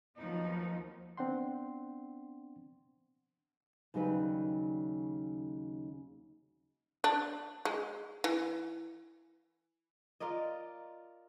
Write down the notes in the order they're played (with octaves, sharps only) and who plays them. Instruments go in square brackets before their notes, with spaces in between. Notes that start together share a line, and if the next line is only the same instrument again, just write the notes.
[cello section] D#2 F3 F#3 B3 D#4
[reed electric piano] B3 C4 D4 F#5 G5 C6
[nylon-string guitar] D#2 C#3 F#3 G3 D#4 B4
[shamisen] D4
G#3
E3
[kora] F4 A#4 D5 D#5